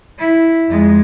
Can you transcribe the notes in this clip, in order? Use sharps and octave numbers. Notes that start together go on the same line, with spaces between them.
E4
F2 G#3